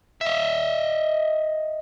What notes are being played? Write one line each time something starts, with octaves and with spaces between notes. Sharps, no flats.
D#5 E5